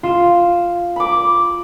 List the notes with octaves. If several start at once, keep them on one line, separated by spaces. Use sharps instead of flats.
F4 E7
B5 D6